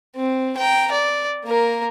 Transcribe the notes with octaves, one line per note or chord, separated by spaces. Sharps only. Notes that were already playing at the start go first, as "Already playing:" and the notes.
C4
G5 A#5
D5
A#3 A#4